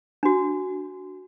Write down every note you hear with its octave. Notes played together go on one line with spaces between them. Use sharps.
D4 F#4